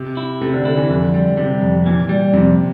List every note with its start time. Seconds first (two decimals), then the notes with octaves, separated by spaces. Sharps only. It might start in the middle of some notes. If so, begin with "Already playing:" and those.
Already playing: C3
0.17 E4
0.41 C3 A3
0.53 D3
0.65 D3 E4
0.77 E3
0.89 F2 D3
1.14 G3
1.37 C3 G3
1.62 F2
1.86 A#2 E3
2.09 G3
2.33 F2 C3